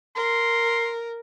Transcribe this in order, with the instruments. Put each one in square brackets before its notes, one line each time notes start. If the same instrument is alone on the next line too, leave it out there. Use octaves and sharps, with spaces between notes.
[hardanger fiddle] A#4 [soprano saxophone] C6